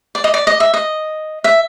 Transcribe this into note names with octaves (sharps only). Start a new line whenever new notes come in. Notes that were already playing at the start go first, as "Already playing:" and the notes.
D5
D#5
D5
D#5
E5
D#5
E5